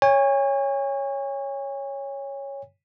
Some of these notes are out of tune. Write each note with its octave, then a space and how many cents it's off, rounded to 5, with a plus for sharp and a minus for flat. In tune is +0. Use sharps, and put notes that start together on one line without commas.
C#5 +0 G#5 -40